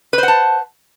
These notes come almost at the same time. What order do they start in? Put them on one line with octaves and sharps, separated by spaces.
B4 C5 F#5 A5